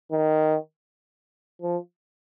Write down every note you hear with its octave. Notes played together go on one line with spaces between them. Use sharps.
D#3
F3